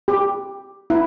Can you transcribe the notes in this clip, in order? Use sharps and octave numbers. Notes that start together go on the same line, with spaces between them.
G4
E4